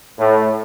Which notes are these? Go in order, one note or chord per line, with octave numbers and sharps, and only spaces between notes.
A2